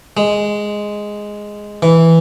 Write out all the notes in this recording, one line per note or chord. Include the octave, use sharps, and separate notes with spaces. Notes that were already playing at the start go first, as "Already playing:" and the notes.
G#3
E3